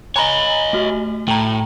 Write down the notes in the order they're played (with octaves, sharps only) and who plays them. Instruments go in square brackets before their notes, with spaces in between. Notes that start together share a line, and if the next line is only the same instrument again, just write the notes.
[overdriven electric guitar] C#5 D#5 [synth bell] G#5 A#5 B5
[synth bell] A3 F#4
[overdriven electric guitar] A2 [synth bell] G5 A#5